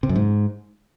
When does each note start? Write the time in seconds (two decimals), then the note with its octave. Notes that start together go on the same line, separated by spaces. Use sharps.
0.03 C3
0.09 F#2
0.16 G#2